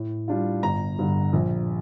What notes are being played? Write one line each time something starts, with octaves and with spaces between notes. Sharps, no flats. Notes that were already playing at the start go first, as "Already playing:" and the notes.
Already playing: A2
G3 D4 F4
G1 A#5
G2 D3
A#1